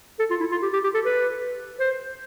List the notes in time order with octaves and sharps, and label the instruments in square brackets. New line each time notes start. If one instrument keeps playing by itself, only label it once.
[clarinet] A4
F4
E4
F4
G4
G4
G4
A4
B4
C5